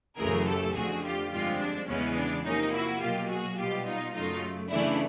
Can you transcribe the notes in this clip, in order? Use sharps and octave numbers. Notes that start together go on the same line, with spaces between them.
F#2 C#3 E3 A3 G#4 A#4
G4 A4
F2 D3 F3 A3 F#4 G#4
F4 G4
G2 D3 F3 G#3 C4 F4 G4
D4
E2 C#3 E3 G#3 B3 C#4
D4
C3 F3 A#3 C#4 D#4
E4 F#4
B2 F#3 A#3 F4 G4
F#4 G#4
B2 G3 B3 F4 G4
D#4 F4
F#2 C#3 F#3 A3 D#4 F4
C#3 E3 A3 D4 E4